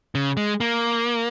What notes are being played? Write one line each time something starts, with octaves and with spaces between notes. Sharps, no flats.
C#3
G#3
A#3